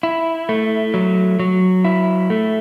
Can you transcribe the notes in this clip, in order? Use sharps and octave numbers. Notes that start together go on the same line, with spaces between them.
E4
A3
F#3
F#3
E4
A3